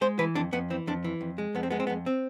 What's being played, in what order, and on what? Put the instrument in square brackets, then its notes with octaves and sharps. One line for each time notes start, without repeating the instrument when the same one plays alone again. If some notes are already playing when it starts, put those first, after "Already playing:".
[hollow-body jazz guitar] G#3 C5
E3 B4
F2 D4
F2 B3
E3 C4
F2 D4
E3
F2
G#3
F2 B3
C4
G#3 B3
C4
B3
F2
C4